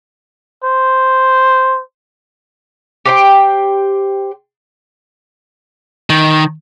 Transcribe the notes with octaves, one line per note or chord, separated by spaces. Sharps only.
C5
G4 C5 G5
D#3